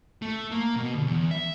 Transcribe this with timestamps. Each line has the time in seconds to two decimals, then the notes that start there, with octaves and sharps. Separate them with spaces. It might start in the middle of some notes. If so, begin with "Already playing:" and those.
0.22 A3
0.51 A#3
0.76 B2
0.95 D3
1.07 E2
1.31 E5